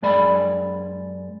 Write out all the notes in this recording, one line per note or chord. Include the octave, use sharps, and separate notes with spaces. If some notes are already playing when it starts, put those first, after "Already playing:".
F#2 G#3 D5 B5